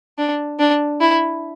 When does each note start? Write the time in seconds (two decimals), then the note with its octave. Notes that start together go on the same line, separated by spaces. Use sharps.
0.18 D4
0.59 D4
1.01 E4